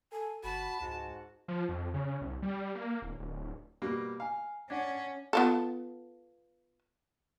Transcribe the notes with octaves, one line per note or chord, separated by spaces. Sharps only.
A4 G#5
G1 F#4 A5 B5
C#2 G#2 F#4
F3
F2
C#3
C2
G3
A#3
D1
D1
B2 G3 A#3
F5 G#5 A#5
C#4 D4 F#5 G#6
B3 F4 A4